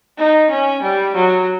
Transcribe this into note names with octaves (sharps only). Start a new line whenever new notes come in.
D#4
C#4
G3
F#3